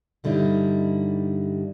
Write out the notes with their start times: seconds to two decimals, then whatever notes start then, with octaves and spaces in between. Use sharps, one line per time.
0.24 G2 D3 G3 D#4 E4